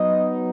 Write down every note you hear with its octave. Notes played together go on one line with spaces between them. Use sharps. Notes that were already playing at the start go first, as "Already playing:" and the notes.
Already playing: F#3 B3 D#4 D#5